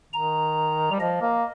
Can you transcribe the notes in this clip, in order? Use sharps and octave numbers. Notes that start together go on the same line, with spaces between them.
D#3 A#5
G3
F3 D#5
A#3